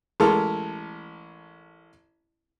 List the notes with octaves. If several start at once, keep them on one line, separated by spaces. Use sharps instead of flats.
A1 G#3 A4 A#4 F6